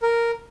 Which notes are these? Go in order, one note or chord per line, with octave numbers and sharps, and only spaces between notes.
A#4